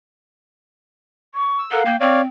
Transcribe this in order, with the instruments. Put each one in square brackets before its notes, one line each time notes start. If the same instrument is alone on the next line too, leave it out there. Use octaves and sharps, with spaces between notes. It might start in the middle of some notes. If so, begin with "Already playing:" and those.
[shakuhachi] C#6
[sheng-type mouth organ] E6
[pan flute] A4 [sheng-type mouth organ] A#4 F#5 [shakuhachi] F5
[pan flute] A#3 [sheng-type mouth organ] G5
[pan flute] C4 [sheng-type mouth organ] C#5 D5 F5 [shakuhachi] G5